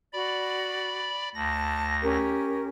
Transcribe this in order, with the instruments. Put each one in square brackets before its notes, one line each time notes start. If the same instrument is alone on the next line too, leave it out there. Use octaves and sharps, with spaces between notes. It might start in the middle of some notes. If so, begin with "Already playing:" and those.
[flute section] F#4 [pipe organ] D5 B5
[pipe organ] D2 A#6 [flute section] A5
[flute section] C#4 G4 A#4